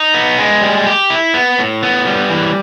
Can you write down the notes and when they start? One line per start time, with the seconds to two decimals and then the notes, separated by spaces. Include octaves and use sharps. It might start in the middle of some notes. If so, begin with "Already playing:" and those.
Already playing: D#4
0.14 B3
0.39 G#3
0.62 G3
0.87 G4
1.10 E4
1.34 B3
1.59 A2
1.83 B3
2.07 G3
2.30 E3